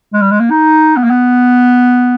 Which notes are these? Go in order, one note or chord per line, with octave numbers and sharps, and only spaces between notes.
G#3
G3
G#3
A#3
D#4
B3
A#3
B3